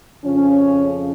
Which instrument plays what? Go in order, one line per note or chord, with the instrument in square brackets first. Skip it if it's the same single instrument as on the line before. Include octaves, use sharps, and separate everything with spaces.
[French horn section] F2 C#3 F3 C#4